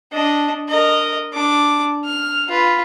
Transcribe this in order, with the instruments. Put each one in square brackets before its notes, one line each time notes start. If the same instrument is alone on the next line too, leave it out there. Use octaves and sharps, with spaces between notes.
[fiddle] D4 D#5
A#4 D#5
D4 D6
F6
F4 B4